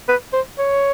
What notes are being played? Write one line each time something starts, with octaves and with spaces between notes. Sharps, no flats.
B4
C5
C#5